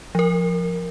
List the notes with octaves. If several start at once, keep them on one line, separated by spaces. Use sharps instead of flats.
F3 A#4